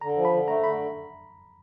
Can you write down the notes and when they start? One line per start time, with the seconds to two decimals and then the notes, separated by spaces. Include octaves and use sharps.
0.01 D3 A#5
0.16 F3
0.25 B5
0.33 D3
0.48 A3 A#5
0.64 D3 B5